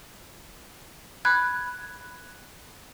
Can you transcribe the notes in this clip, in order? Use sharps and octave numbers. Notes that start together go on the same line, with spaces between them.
B5 F#6 G#6